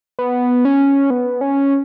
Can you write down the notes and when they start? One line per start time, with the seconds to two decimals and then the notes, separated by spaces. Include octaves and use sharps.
0.19 B3
0.65 C#4
1.10 B3
1.41 C#4